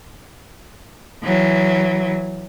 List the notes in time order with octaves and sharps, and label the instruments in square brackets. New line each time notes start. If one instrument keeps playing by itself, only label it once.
[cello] E3 F#3